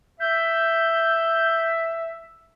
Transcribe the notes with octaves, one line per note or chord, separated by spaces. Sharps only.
E5 G6